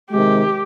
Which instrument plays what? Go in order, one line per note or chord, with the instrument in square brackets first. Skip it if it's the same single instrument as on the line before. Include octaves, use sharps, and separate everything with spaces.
[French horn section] C3 D#3 G#3 [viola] G4